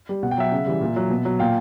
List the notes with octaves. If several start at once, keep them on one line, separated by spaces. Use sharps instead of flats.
G3
B2 F#5
G5
F#3 E5 F#5
C#3
E3 G3
A#2
F#3
B2
F#3
A#2 F5 G5